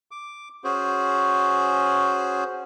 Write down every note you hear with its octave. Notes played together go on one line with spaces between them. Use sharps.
D6
C#4 F#4 G#4 C5